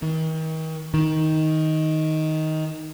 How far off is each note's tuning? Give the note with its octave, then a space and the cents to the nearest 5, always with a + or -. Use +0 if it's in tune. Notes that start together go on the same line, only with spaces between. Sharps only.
D#3 +40
D#3 +10